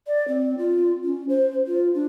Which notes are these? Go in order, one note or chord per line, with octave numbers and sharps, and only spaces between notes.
D5
C4
F4
C#4
C5
F4
D4